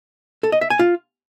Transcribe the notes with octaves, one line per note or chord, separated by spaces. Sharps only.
A4
D#5
E5
G#5
F4